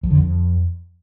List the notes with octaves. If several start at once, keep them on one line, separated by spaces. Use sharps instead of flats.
F2
D3
F2